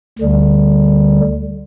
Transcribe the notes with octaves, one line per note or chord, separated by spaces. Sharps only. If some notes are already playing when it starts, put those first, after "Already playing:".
D2 D3 G3